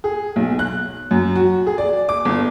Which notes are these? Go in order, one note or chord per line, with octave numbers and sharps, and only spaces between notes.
G#4
B1
F#6
F#2
F#4
G#4
D5
D6
G1